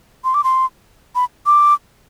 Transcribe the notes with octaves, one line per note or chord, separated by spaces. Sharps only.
C6
D6
C6
B5
D6